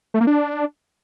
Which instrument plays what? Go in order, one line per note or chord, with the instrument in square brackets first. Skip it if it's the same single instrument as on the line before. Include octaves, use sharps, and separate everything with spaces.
[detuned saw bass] A3
A#3
D4